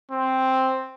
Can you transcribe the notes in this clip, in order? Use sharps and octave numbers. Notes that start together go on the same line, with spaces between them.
C4